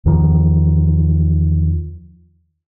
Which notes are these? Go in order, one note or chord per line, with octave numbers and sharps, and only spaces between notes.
E2 D#3 F3